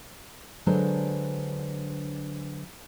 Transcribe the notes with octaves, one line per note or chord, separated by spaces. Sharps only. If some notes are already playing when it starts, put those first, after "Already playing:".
D3 F#3 G#3 D4 B4 C5